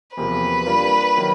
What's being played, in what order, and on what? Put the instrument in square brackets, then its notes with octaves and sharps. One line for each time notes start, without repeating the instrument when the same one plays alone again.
[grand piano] E2 C3 F3 A#3 [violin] B4
[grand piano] G3 A#3 D4 F4 A#4
D#3 F#3 A#3